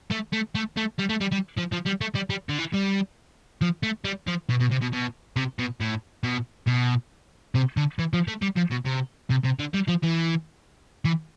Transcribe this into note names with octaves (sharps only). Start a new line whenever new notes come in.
A3
A3
A3
A3
G3
A3
G3
G3
F3
F3
G3
A3
G3
G3
D3
E3
G3
F3
A3
G3
F3
B2
B2
C3
B2
B2
C3
B2
A2
B2
B2
C3
D3
E3
F3
A3
G3
F3
B2
C3
C3
C3
D3
G3
F3
E3
E3